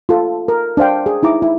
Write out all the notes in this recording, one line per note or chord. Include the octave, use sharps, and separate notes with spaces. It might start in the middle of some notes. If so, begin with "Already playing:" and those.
F4 A4
A#4
D4 C5 F5 G5
G#4
D#4 E4 A#5 D6
E4